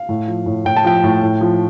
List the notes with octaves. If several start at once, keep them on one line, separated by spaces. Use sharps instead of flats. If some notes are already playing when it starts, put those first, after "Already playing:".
Already playing: F5
A2
F3
A2
A2 G5
A5
F3 G5
A2
A2
F3